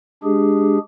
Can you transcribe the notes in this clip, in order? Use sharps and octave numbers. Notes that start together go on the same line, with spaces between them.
G#3 D4 G4 G#4